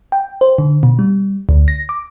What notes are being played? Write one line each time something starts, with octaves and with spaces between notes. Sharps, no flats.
G5
C5
D3
B2
G3
D2
A#6
D6